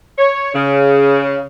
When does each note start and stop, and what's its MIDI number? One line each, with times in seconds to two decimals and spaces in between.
0.19 0.52 73
0.54 1.47 49